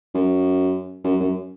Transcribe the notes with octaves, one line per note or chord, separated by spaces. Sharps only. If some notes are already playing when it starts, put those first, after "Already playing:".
F#2
F#2
F#2